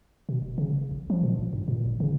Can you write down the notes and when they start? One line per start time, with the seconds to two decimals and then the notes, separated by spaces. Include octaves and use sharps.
0.29 B2
0.42 F1
0.58 C#3
0.73 E1
0.91 A#1
1.10 F3
1.23 A#2
1.38 A1
1.53 G2
1.68 A#2
1.86 G#1
2.00 C#3